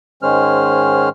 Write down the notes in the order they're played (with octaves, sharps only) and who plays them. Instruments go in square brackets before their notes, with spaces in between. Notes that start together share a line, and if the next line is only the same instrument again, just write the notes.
[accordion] G#2 D#3 G#3 C#4 C5 F6